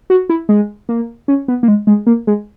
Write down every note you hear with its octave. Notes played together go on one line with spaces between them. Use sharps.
F#4
E4
G#3
A#3
C#4
B3
A#3
G#3
G#3
A#3
G#3